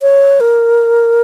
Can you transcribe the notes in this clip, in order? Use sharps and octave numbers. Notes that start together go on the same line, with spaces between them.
C#5
A#4